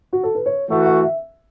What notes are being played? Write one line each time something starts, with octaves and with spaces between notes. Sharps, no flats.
F#4
A4
B4
C#5
E3 A3 F#4 E5
F#5
E5